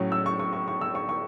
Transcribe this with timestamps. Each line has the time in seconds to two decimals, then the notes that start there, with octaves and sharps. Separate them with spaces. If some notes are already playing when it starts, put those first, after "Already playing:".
Already playing: A2 F#3 C#4
0.12 E6
0.26 C#6
0.39 C#6
0.53 C#6
0.68 C#6
0.81 E6
0.95 C#6
1.09 C#6